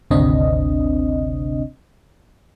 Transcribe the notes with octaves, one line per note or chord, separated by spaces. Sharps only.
G#1 D2 C3 C4 D4 D#5